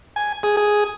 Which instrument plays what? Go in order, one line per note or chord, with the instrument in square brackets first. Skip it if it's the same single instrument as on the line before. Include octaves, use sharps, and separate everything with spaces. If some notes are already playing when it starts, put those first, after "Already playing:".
[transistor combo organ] G#5
G#4
G#4